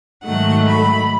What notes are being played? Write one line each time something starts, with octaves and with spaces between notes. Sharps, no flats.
G#2 D#3 F#3 A3 F#5
B5